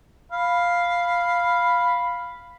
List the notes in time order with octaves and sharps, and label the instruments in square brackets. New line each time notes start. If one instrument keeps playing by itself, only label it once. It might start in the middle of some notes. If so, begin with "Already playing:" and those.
[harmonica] F5 B5